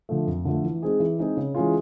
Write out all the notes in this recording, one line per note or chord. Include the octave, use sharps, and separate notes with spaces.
D3 F3 A3
F2
D3 F3 A3
E3
G#3 C4 D#4 G#4
E3
G#3 C4 D#4 G#4
C#3
E3 G#3 C#4 F4